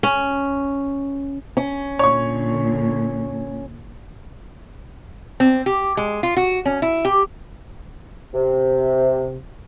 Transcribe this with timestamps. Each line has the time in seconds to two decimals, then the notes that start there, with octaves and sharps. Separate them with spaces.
0.03 C#4
1.57 C#4
1.99 A#2 D3 C#5 C#6
5.40 C4
5.66 G4
5.97 G#3
6.23 F4
6.37 F#4
6.65 C#4
6.82 E4
7.05 G4
8.34 C3